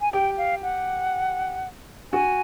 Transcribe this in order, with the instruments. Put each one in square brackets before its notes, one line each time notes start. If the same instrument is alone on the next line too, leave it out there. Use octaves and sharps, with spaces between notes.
[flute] G#5
[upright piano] G4 [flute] G5
[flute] F5
F#5
[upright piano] F#4 [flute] G#5